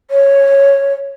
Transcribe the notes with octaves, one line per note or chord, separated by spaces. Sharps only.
C#5